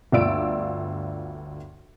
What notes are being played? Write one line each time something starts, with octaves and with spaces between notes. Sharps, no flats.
G1 D2 F4 D5 E6 D7